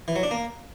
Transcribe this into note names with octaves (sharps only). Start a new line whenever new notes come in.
E3
F#3
D4
A#3